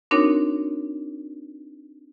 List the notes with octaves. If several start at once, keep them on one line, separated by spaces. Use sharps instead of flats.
C4 D4 D#4 F#4 A#4 C#5